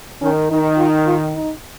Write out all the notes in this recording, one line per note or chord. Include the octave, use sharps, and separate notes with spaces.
D#3 C#4
D#3 D#4
F4
F4
D#4